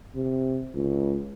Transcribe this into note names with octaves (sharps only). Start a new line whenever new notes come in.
C3
C#2